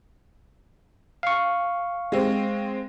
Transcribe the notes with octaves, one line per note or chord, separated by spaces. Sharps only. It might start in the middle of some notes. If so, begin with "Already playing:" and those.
F5 C#6
G#3 C4